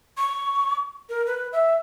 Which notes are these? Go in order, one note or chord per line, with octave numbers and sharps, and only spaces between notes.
C#6
A#4
B4
E5